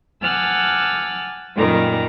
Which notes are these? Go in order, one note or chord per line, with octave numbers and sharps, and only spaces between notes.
F#5 G#5 A5 D6 E6 F6
F#2 A#2 D#3 G3 A#5